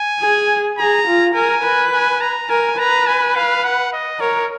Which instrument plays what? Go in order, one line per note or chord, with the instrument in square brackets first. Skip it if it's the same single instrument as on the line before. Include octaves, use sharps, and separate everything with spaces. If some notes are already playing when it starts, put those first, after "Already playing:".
Already playing: [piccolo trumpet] G#5
[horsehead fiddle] G#4
[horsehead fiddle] G#4 [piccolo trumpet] A#5
[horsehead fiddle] F4
[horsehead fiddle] A#4 [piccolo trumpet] G#5
[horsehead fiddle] B4
[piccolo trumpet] G#5
A#5
[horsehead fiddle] A#4 [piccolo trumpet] G#5
[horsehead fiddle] B4 [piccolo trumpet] A#5
[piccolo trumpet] G#5
F5
F#5
D#5
[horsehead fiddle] A#4 [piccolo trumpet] C#5